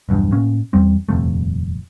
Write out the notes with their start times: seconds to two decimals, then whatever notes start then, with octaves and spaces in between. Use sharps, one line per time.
0.09 B1 E2 G2
0.32 A2 A#3 C#4
0.73 E2 G3 C4
1.09 D#1 F2 C3 A3